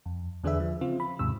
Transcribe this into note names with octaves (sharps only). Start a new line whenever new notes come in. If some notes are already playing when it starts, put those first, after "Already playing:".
F2
E2 D3 D4 G#4 B4 E5
F3
C#3 C4 F4
B5
D#2 G#2 C3 E6